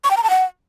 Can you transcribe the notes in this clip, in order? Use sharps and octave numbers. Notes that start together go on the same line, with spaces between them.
C#6
G5
A#5
A5
F#5